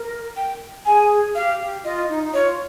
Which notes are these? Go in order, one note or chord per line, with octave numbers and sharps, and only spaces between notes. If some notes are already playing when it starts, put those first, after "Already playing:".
Already playing: A#4
G5
G#4 G#5
G4 F5
G4
F4 D#5
D#4
D#4
F4 C#5